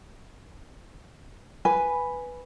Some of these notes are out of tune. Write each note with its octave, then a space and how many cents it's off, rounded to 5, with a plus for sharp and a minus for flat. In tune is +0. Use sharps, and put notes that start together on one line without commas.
B4 +0 G#5 +0